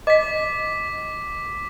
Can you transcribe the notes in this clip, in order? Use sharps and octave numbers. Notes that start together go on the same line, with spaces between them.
D#5 D6 B6